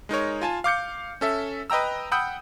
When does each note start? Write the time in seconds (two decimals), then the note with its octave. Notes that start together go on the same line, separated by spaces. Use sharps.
0.09 G#3 D#4 A#4 C#5
0.41 F4 G#5 A5
0.64 F5 D6 G6 C#7
1.21 C#4 A4 E5
1.70 B4 D#5 G5 A#5 E6
2.12 F#5 G5 B5 D#6 E6 G6